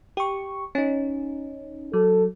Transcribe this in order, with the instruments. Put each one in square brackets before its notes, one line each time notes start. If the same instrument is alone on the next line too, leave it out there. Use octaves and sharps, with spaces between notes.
[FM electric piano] G4 C#6
C#4 D#4
[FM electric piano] F#3 [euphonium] A4